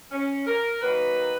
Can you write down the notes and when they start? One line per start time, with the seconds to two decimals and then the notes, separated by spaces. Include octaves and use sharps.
0.11 C#4
0.46 A#4
0.81 D#3 F#3 A#3 B4